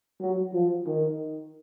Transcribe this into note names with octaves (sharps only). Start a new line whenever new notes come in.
F#3
F3
D#3